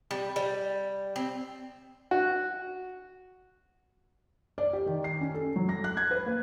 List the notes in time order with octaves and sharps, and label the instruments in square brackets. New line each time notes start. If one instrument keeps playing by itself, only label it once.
[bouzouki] G3
G3
C4
[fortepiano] F#4
[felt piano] D5
G4
D#3
C7
C#4
A4
F#3
A#6
F#6
G#6
B4
A#3